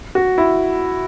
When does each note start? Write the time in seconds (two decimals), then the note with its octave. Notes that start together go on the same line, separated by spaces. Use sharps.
0.15 F#4
0.38 E4